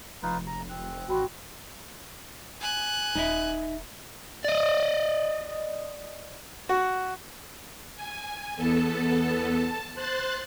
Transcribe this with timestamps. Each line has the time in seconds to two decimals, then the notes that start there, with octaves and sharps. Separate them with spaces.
0.23 F1 F3 D#4 F4 B4
0.47 A#5
0.69 C4 F#6
1.09 A1 F#4 G5 B5 C6
2.61 G#5 F#6
3.15 D#1 D#4 D#5 E5
4.44 D5 D#5
6.69 F#4
7.95 G#5
8.56 E2 B3 A4 A5
9.56 A5
9.95 C5 C6 F#6 A6